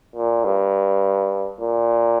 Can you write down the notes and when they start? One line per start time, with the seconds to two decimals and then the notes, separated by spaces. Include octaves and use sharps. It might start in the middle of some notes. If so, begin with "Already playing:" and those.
0.15 A#2
0.44 G2
1.60 A#2